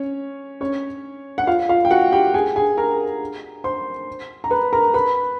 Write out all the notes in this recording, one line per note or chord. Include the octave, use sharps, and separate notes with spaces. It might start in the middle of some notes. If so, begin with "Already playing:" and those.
Already playing: C#4 C#5
C#4 C#5
F#5
F4 F5
F4 F5
G5
F#4 F#5
G4 G5
G#4 G#5
G#4 G#5
A#4 A#5
C5 C6
A#5
B4 B5
A#4 A#5
B4 B5